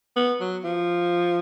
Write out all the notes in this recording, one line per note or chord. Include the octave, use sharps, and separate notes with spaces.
B3
F#3
F3